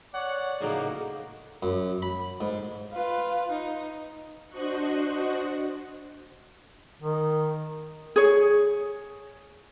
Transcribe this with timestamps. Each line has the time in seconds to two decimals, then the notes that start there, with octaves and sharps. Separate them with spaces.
0.14 C#5 D5 F#5
0.61 A2 C#3 F#3 A#3 D#4
1.63 F#2
2.02 B5
2.41 G#2
2.92 F4 B4
3.51 D#4
4.50 D4 F#4 C5 D#5 C#6 F#6
7.02 D#3
8.16 G#4 C#5